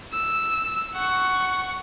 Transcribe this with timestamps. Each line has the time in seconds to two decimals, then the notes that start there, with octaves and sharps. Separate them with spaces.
0.13 E6
0.94 F#5 C#6